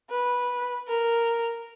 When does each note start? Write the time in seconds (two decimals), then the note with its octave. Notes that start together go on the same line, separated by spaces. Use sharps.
0.11 B4
0.88 A#4